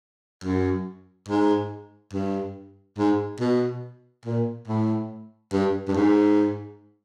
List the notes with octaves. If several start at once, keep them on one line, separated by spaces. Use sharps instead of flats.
F#2
G#2
G2
G#2
B2
A#2
A2
G2
G2
G#2